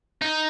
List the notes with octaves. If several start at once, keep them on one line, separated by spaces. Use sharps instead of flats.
D#4